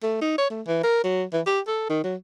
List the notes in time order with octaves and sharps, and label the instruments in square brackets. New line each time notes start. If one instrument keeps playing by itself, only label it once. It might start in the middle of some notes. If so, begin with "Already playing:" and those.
[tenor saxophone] A3
D#4
C#5
A3
E3
A#4
F#3
E3
G4
A4
D#3
F#3